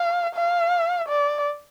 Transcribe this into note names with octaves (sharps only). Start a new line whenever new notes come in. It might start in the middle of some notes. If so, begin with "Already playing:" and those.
Already playing: F5
F5
D5